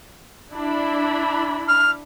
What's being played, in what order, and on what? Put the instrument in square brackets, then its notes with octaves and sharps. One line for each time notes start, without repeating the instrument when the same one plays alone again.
[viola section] D4 E4 B5
[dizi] F6